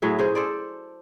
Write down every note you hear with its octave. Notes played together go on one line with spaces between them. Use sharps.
A2 F#3 G#4 E5
C#4 G#4 C5
A4 C5 D5